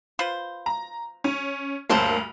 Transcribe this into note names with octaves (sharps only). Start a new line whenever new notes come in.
F4 B4 C5
A#5
C#4
D2 G2 F#3 A#3 A4 C5